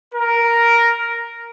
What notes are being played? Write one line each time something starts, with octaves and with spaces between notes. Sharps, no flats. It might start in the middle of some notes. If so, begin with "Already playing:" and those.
A#4